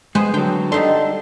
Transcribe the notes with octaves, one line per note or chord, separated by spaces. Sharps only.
G#3 B3 G#4 C5
D3 F#3 G5
G3 D4 D#4 A4 C6